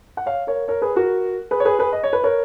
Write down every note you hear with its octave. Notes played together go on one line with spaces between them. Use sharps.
F#5
C#5 F5
A#4 C#5
A#4 C#5
G#4 B4
F#4 A#4
G#4 B4
C#5
G#4 B4
G#4 B4
D#5
C#5
B4
A#4 C#5